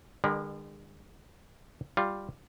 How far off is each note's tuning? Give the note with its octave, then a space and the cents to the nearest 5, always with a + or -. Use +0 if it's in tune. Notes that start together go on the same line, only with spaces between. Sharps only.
D3 +40 G#3 -45 A#4 +30
G3 +0 F4 +0